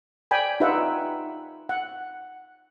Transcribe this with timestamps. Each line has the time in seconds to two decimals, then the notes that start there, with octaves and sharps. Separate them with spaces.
0.31 D5 G5 G#5 B5
0.60 D#4 F4 G4 B4 E5 F#5
1.69 F#5